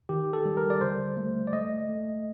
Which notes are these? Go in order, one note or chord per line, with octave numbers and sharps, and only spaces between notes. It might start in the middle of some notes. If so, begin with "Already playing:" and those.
D#3 G4
A4
G3
A#4
D5
D3 C5
A3
D5
A3 D#5
A3